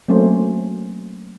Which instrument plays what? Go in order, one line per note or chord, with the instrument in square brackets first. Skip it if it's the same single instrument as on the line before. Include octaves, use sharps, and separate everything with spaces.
[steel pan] F#3 A3 A#3 C4 C#4 C5